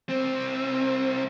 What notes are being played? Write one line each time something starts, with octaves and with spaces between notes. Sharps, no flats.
C2 C4